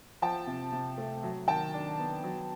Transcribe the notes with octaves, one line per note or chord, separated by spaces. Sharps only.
F3 G5 A5
C3
C3
A3
F#3
D#3 G5 A5
D4
B3
F#3